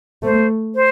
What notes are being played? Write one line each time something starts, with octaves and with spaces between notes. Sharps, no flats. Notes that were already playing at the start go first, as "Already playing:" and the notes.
A3 C5
C5